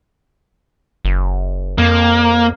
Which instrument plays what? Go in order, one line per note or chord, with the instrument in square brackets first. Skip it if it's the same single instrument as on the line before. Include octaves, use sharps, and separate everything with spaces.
[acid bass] F#1
[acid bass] F2 [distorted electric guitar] A#3